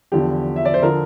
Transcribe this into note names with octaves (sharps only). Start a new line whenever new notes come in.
E2 D3 F3 G4
E5
D5
C5
D3 F3 A#4